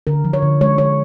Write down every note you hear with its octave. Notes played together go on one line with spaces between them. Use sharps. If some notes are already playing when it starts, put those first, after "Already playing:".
D3 A#4
F3
C#5
D3
G#3 C#5
D3 C#5